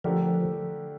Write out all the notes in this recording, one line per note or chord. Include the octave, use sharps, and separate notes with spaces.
D3 F3 A3 D4 G4 A#4